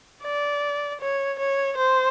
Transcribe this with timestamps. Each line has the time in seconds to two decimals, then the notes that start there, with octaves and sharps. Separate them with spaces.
0.24 D5
1.01 C#5
1.39 C#5
1.78 C5